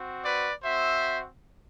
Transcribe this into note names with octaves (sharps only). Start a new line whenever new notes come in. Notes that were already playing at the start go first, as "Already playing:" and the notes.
Already playing: C4 F#4
B4 D5
C4 F#4 C5 E5